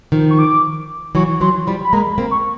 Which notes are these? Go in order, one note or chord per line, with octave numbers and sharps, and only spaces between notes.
D#3 F3
C#6
D6
E3 F#3 C#6
E3 F#3 C6
F3 G3 B5
B5
G#3 A#3 A#5
B5
A#3 C4
C#6